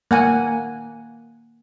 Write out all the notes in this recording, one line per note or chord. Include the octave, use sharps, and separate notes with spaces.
A#3 F#5 G#5